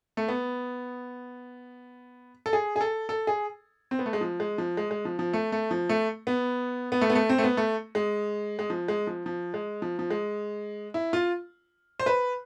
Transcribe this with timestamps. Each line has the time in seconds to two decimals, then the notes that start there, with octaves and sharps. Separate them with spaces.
0.17 A3
0.28 B3
2.46 A4
2.53 G#4
2.76 G#4
2.81 A4
3.09 A4
3.27 G#4
3.91 C4
3.99 B3
4.06 A3
4.13 G#3
4.21 F3
4.40 G#3
4.58 F3
4.77 G#3
4.91 G#3
5.05 F3
5.19 F3
5.33 A3
5.52 A3
5.71 F3
5.89 A3
6.27 B3
6.92 B3
7.01 A3
7.10 B3
7.15 A3
7.29 C4
7.38 A3
7.44 B3
7.57 A3
7.95 G#3
8.59 G#3
8.70 F3
8.88 G#3
9.07 F3
9.26 F3
9.54 G#3
9.82 F3
9.99 F3
10.10 G#3
10.94 E4
11.13 F4
12.00 C5
12.06 B4